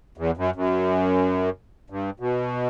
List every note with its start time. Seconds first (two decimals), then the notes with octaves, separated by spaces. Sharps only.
0.18 E2
0.37 F#2
0.56 F#2
1.90 G2
2.20 B2